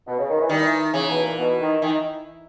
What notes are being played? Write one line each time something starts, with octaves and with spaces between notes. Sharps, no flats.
B2
C#3
D#3
E3
D#3 G3
E3
C#3 E3
B2
A#2
B2
D#3
D#3 E3